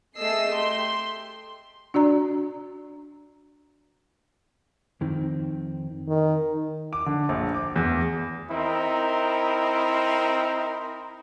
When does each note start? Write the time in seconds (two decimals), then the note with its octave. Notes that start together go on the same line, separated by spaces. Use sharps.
0.18 A3 G#4 D#5 E6 C7
0.51 G4 C6
1.94 D4 F#4 D5 A#5
5.01 F2 D#3 C4
6.08 D#3
6.93 D6
7.06 D3
7.29 A#1
7.55 D6
7.76 E2
8.51 C4 D#4 E4 A#4